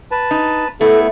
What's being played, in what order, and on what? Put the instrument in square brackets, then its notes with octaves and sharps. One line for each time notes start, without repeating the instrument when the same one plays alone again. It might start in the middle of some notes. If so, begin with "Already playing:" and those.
[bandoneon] B4 A5
[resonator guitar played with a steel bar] D#4
[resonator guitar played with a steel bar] A3 [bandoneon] B3 E4 [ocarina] A4